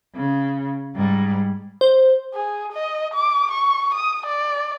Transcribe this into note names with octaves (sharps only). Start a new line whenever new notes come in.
C#3
G#2 G3
C5
G#4
D#5
D6
C#6
D#6
D5